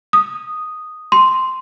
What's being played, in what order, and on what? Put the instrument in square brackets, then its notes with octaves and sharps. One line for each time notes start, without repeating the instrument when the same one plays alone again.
[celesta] D#6
C6